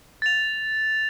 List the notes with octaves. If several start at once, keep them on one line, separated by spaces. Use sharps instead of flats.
A6 F7